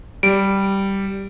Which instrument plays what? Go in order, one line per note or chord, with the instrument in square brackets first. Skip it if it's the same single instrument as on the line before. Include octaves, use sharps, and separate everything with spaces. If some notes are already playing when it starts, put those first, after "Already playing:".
[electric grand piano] G3 [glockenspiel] D7